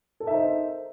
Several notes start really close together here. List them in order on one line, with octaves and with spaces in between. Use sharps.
A4 A#4 E5 D#4 C5